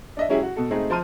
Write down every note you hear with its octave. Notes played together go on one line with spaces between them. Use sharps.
D4 D#5 E5
F#3 G#3 C#4 E4 G4 G#4
F#4
B2 A4
G#3 A3 C4 D#4 G#4
F3 C5 A5 C6 F6 D#7